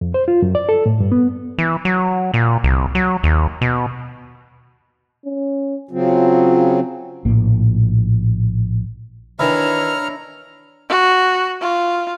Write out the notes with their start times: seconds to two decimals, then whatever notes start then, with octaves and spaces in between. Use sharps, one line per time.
0.01 F2
0.14 C5
0.28 F4
0.42 F#2
0.55 D5
0.69 A4
0.86 A2
1.00 G2
1.12 B3
1.58 E3
1.85 F#3
2.34 A#2
2.64 C2
2.95 F#3
3.23 D#2
3.61 B2
5.26 C#4
5.91 C#3 F#3 C4 F4
7.25 A#1 A2 A#3
9.39 D#3 E3 D4 E4 C#5 A#5 F6
10.89 F#4
11.61 F4